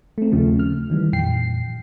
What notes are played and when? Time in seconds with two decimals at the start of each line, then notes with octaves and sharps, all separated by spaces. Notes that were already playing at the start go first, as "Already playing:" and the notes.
0.18 A3 C4
0.32 D#2 C#3 F3 A3
0.59 F6
0.90 D#3 E3 G3
1.13 F2 A#2 G5 C7